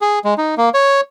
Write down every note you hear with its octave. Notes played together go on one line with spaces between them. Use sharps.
G#4
G#3
D#4
A#3
C#5